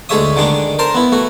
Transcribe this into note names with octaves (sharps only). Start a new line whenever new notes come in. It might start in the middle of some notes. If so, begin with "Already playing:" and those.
D2 G#3 A4 C#5 E5 D#6
D3 D#3 G#3 D4
A#4 C5 A5 A#5
B3 E4
A3 F#4